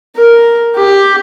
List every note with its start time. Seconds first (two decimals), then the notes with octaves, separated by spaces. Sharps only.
0.16 A#4
0.75 G4